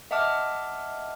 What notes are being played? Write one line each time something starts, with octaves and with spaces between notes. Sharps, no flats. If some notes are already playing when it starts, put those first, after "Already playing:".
D#5 E5 F#5 A5 D6 F6